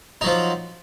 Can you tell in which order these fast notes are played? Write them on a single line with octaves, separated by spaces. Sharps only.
D#4 F#3 F3